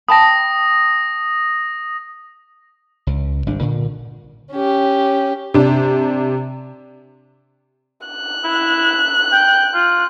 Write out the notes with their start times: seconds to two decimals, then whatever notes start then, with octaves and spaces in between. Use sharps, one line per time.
0.08 G5 A5 B5 D#6 A#6
3.07 C#2
3.46 G#1 G3 D4
3.61 A#2 D3
4.52 C#4 G4
5.54 C3 D4
8.07 F#6
8.44 E4
9.33 G5
9.74 F4